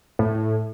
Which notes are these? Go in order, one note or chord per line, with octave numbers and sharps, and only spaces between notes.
A2